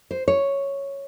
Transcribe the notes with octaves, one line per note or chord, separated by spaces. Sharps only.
C5
C#5